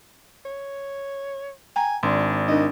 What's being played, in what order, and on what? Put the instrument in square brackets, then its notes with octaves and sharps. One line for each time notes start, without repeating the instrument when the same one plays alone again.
[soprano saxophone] C#5
[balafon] G5 A#5 [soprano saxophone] G#5
[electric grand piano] G#1 [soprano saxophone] D4 [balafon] C6
[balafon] D4 D#4 A#4 [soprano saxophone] D#5